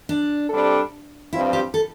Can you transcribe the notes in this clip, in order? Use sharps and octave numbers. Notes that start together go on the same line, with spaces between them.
D4
C3 G3 D4 A4
G2 F3 C4 E4 F4
G4
A4